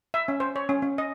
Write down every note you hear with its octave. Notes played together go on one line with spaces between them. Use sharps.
E5
C#4
C5
C#5
C#4
C#4
D#5